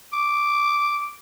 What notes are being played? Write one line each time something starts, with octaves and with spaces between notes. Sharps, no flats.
D6